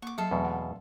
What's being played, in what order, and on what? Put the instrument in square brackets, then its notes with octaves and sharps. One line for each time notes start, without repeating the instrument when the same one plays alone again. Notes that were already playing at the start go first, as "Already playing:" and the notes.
[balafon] A#3 [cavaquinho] C#6 D6
[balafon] F#3 G#4 E5 [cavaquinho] F4 A4 F5
[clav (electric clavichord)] E2 B2 [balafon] F#3 A3 C4
[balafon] F#5